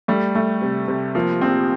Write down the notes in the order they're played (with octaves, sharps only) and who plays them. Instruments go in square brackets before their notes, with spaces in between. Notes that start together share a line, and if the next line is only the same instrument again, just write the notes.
[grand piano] G3 [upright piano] A3
[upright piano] A3
C3
C3
[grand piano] F3 [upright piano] A#3
[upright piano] A#1 [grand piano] C4